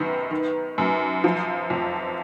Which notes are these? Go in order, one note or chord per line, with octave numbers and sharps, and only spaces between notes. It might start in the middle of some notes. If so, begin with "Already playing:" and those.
Already playing: F#2 D#3 B3
D#3
F#2
F3
F2